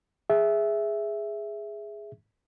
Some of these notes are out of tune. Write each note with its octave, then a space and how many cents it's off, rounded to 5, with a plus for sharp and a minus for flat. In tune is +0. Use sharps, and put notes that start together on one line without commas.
G#4 +0 E5 +0